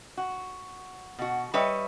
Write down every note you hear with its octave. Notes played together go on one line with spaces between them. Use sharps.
F#4
B2 F#4
G3 B4 C#5 D#5 E5